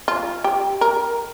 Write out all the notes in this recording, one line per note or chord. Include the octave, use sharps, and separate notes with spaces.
F4
G4
A#4